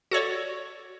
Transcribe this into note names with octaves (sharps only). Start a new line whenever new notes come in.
F#4 A4 C#5 D5